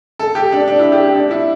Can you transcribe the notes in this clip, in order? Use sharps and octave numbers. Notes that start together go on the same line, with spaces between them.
A4
G4
D4
D4
E4
G4
G4
D4
E4